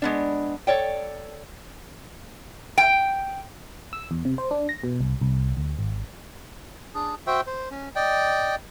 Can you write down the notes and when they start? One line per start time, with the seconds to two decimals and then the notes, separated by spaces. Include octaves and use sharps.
0.02 G#3 B3 D4
0.67 A4 C#5 D5 G5
2.78 G5
3.93 E6
4.11 E2
4.25 C3
4.38 C5
4.51 D4
4.69 A#6
4.84 B2
5.00 C2
5.21 C2
5.57 D2
5.79 G#1
6.95 D4 G#4
7.27 F#4 C5 E5 G5
7.47 C5
7.71 C#4
7.96 D5 D#5 G5